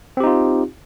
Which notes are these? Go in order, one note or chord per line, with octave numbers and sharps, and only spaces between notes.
C4 D#4 F4 G4